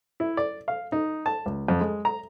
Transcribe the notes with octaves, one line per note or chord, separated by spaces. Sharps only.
E4
D5
F5
D#4
A5
C#2
F2
G#3
A#5